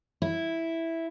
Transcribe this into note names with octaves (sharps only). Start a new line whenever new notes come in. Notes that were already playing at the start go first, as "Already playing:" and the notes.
E4